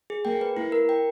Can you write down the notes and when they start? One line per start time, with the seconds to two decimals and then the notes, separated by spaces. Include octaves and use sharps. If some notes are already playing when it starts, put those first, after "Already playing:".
0.10 G#4
0.25 A#3 G5
0.41 B4
0.56 A#3 E4
0.72 A#4
0.89 G5